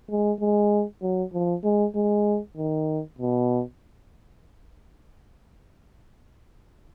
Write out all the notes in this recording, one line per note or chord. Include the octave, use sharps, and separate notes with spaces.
G#3
G#3
F#3
F3
G#3
G#3
D#3
B2